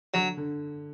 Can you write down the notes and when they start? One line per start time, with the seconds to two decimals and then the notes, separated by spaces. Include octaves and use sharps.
0.14 D3 F#3
0.37 D3